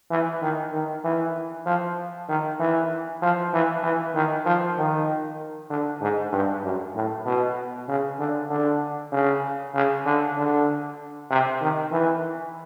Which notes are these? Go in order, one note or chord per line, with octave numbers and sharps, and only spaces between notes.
E3
D#3
D#3
E3
F3
D#3
E3
F3
E3
E3
D#3
F3
D#3
D3
G#2
G2
F#2
A2
B2
C#3
D3
D3
C#3
C#3
D3
D3
C3
D#3
E3